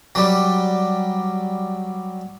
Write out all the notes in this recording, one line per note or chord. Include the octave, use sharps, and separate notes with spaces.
F#3 G3